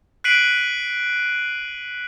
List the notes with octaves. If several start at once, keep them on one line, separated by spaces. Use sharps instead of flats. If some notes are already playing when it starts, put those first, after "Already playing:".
F#6 B6 C7 D7 D#7 F#7